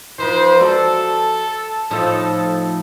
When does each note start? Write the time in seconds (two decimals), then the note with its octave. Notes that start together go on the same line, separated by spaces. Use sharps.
0.18 E3 F3 D#4 B4 C5
0.60 F#4 A4 D5
1.91 A2 F3 D#4 A4